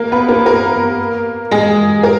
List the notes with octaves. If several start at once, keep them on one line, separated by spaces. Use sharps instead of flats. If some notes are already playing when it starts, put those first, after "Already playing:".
Already playing: A#3 A#4
B3 B4
A#3 A#4
A#3 A#4
G#3 G#4
A#4